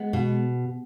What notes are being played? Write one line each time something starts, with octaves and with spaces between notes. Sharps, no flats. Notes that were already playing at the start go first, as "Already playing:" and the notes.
Already playing: G#3 B3
B2